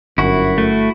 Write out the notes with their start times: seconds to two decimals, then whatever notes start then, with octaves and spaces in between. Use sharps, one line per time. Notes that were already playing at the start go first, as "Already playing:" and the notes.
0.18 G1 F#2 E4 F#4
0.58 A3